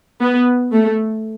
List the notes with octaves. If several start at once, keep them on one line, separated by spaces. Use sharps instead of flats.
B3
A3